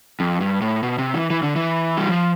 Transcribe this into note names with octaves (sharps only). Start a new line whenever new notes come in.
F2
G2
A2
B2
C3
E3
E3
D3
E3
G3
F3